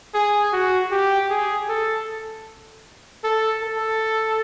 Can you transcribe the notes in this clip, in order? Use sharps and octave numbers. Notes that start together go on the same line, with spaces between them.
G#4
F#4
G4
G#4
A4
A4
A4